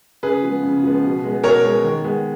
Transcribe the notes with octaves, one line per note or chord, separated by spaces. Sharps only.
C#3 G#4 B4
F3 G#3 B3
C#3
F3 G#3 B3
B2
G#3 B3
B2 A#4 C#5
G#3 B3
D#3
G#3 B3